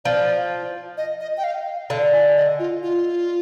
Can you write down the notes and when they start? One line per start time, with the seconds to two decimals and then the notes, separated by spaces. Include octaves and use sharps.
0.05 F3 D5
0.97 D#5
1.20 D#5
1.37 G5
1.44 F5
1.90 D3 F5
2.13 G#5
2.36 D#5
2.59 F4
2.83 F4